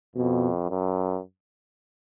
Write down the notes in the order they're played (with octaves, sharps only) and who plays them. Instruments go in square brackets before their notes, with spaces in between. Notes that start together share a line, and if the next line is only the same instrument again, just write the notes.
[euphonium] F2 [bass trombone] B2
[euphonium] F#2